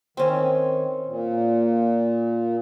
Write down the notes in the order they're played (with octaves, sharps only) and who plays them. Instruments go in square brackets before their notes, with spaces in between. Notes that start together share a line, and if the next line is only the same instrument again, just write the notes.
[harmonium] D#3 [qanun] C4 C#4
[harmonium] A#2